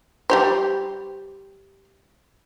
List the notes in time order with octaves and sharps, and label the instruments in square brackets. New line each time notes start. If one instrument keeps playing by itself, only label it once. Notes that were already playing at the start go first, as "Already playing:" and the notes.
[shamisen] G3 G4 C5